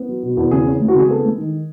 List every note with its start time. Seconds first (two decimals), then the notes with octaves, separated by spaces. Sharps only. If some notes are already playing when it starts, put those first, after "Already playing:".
Already playing: B3
0.09 F#3
0.23 B2
0.37 E2
0.51 C#3 G#4
0.66 C#4
0.80 G#3
0.88 F#4
0.94 C#3 G#4
1.09 B3 A4
1.24 G#3
1.38 D#3